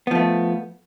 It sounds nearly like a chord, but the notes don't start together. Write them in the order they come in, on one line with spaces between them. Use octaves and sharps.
B3 F3 A3